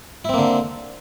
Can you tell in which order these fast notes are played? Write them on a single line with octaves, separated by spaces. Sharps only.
E4 C4 A#3 D3